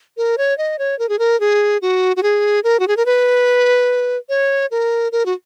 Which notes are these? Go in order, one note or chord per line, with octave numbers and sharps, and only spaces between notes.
A#4
C#5
D#5
C#5
A#4
G#4
A#4
G#4
F#4
F#4
G#4
A#4
F#4
G#4
A#4
B4
C#5
A#4
A#4
F#4